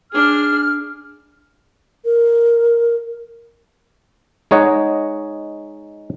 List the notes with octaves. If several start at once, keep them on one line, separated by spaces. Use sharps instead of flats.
D4 G#4 F6
A#4
G#3 D#4 C#5 D#5 F#5